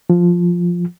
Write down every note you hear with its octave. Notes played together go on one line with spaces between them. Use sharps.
F3